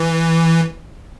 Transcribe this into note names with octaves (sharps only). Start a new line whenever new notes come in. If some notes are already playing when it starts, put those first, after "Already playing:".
Already playing: E3